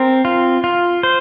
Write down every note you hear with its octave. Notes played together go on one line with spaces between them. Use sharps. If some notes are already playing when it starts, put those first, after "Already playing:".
Already playing: C4 A#4
F4
F4
C5